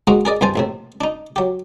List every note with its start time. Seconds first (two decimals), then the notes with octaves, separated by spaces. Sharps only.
0.07 G#2 G#3 A#3 F#4 D#5 A#5
0.25 G#4 A#4 D5 D#5
0.41 C2 G2 E3 C5 G#5 A5
0.56 A#1 A2 C3
1.01 D4 D#4
1.36 F#3 G4